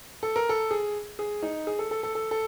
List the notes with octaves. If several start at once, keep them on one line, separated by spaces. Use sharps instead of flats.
A4
A#4
A4
G#4
G#4
D#4
G#4
A4
A4
A4
A4
A4